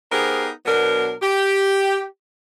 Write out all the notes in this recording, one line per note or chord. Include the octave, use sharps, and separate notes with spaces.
B3 D#4 G4 G#4 A#4 C5
B2 F#3 B3 D4 A#4
G4